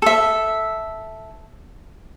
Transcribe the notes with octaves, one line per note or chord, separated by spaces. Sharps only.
A4 E5